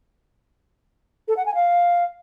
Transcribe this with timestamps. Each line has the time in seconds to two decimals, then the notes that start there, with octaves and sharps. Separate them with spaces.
1.28 A4
1.37 F#5
1.46 G#5
1.55 F5